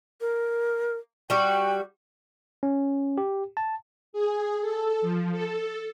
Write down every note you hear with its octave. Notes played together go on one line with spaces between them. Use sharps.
A#4
G3 F#4 G5
C#4
G4
A5
G#4
A4
F3
A4